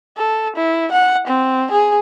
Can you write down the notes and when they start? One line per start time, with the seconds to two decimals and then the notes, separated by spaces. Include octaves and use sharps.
0.17 A4
0.56 E4
0.92 F#5
1.27 C4
1.71 G#4